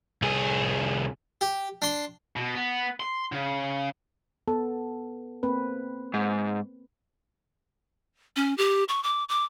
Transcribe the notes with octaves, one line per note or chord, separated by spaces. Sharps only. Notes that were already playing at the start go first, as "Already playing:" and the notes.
C2 G#4
G4
D4 C6
B2
B3
C6
C#3
B3 A4
A#3 C4 B4
G#2
C#4
G4
C#6
D6
D6